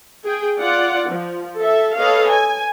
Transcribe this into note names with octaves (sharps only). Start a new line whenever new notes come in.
G#4 G5
F4 D5 F#5
F3
A4 E5
A4 B4 C#5 D#5 F5
G#5